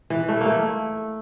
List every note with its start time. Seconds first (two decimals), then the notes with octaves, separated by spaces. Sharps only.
0.10 E3
0.28 A3
0.41 A#3
0.46 A3